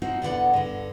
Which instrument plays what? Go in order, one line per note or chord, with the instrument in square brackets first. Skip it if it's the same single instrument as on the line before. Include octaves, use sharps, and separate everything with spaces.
[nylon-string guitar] F3 C4 D#4 F#4
E2 B2 D3 F4 D5 F#5
G2 D3